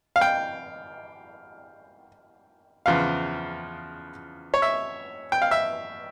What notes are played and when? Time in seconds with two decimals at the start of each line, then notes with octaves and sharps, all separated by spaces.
0.16 F5
0.21 G5
2.86 E2 C#3 F3 F5
4.54 C#5
4.62 E5
5.32 G5
5.42 F5
5.51 E5